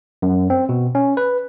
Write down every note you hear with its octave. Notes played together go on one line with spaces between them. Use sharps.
F#2
C4
B2
C#4
B4